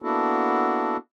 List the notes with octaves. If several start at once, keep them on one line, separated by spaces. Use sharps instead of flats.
A#3 B3 D4 E4 F#4 A4